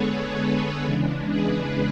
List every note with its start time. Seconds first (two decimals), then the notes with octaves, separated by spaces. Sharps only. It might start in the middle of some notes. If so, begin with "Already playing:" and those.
Already playing: D3 G#3 B3 G#4 A4 B4 C#5
0.35 G#4 B4
0.82 E2 C#3 E3 G#3 D4
1.30 G#4 B4